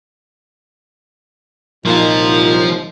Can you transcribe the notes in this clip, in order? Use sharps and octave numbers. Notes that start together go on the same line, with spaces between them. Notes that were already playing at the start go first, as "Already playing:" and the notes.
C2 A#2 F3 F#3 D#4 F4